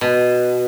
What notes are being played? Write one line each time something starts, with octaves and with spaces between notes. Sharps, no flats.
B2